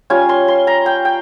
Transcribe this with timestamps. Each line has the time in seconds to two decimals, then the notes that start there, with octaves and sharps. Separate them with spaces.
0.10 G3 C#4 F4 G#5
0.29 C6
0.48 C6
0.67 A#5
0.86 G5
1.05 G5